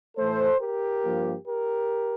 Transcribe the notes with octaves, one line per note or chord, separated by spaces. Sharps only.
A2 E3 A3 A4 C5
G4 A#4
G2 F3 A#3
G4 A#4